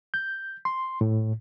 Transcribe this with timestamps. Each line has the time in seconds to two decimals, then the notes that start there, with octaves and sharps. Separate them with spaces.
0.14 G6
0.65 C6
1.01 A2